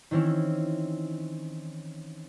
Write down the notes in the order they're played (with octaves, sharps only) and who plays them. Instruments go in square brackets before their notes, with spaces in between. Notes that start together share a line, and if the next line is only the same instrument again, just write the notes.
[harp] D#3 E3 C4 C#4 E4